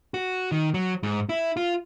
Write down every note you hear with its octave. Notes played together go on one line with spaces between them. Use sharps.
F#4
D#3
F#3
G#2
E4
F4